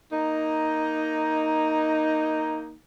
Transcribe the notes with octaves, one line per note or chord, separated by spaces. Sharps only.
A#3 D#4